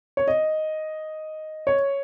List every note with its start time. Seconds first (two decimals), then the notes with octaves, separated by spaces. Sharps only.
0.17 C#5
0.28 D#5
1.67 C#5